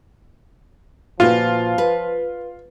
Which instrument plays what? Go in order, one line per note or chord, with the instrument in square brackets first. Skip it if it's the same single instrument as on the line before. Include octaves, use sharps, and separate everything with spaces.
[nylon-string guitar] A#2 F#4 B4 [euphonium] F3 [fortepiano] F4
[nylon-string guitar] B4